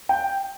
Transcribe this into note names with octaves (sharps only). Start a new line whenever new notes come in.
G5